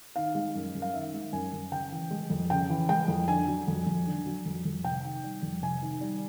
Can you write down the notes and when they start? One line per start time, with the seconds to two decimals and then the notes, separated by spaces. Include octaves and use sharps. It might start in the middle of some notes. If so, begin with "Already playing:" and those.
0.16 D#3 F5
0.35 G#3
0.55 F#2
0.75 F#2
0.82 F5
0.94 D#3 E5
1.13 G#3
1.33 F#2 G#5
1.53 F#2
1.71 C#3 G5
1.92 E3
2.11 G#3
2.30 F2
2.50 C#3 G5
2.70 E3
2.89 G#3 G5
3.08 F2
3.28 D3 G#5
3.48 F#3
3.68 F2
3.87 F2
4.07 D3
4.26 F#3
4.45 F2
4.65 F2
4.84 C3 G5
5.04 D#3
5.24 G3
5.42 F2
5.62 C3 G#5
5.82 D#3
6.01 G3